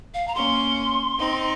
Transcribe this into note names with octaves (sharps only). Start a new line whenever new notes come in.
F5
A#5
A#3 C#4 C6
C4 D#4